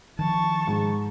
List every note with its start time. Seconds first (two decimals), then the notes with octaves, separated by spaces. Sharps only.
0.19 D#3 F3 A5 C#6
0.67 G#2